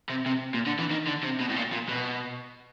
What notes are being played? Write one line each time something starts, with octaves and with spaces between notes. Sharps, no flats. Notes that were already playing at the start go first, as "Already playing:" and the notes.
C3
C3
A#2
D3
E3
D#3
D3
C3
B2
A2
A#2
A#2
B2